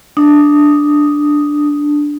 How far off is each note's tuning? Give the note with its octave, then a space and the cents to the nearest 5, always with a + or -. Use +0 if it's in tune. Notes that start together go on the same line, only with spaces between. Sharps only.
D4 +0 D#6 +0